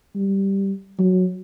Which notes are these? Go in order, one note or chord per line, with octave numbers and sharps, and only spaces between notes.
G3
F#3